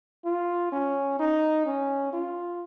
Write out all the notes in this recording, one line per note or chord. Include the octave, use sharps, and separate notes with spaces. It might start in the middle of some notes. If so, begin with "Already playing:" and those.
F4
C#4
D#4
C#4
F4